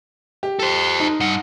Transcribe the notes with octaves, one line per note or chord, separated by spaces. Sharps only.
G4
A4 C5
D#4
G2 F#5